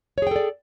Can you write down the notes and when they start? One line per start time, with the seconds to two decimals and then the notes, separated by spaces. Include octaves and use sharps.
0.18 C#5
0.22 G#4
0.27 G5
0.31 A4
0.36 D5